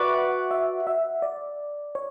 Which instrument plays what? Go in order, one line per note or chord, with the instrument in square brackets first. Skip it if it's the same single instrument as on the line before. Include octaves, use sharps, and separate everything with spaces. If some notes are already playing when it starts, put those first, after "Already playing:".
Already playing: [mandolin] F#4 B4 D5 [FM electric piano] E5
[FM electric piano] F#5
E5
E5
D5
C#5